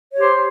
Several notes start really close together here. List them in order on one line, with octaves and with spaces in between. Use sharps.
C#5 G4 C5